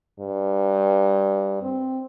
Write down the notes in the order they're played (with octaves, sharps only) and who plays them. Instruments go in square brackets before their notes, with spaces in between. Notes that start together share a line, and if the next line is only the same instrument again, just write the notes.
[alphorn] G2
C4